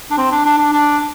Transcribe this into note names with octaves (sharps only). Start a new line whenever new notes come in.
D4
C4
D4
D4
D4
D4